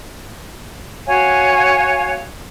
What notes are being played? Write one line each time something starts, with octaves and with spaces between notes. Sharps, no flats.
F#4 C#5 F5 G#5